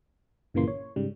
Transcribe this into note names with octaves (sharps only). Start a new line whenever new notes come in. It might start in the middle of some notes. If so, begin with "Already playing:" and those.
G1 A#2 C#3 E3 A#3 C6
C#5
G#2 C#3 G3